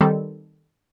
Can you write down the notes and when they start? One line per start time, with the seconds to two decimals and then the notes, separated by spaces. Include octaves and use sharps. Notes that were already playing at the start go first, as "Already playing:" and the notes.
0.01 D#3 G3 C4 A4